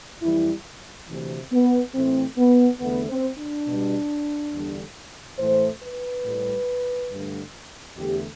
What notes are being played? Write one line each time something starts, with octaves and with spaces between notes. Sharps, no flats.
F2 E3 G3 E4
D2 C3 E3
B3
A2 E3 A3 C4
B3
E2 D3 A3 B3
C4
D4
B2 G3
E2 D3 G3
A2 E3 A3 C5
B4
A2 G3
G2 D3 A3
E2 D3 A3 G4